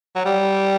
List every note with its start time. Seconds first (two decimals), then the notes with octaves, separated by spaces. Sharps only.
0.16 F#3
0.25 G3